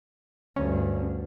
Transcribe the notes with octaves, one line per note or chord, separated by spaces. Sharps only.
D2 G2 C#4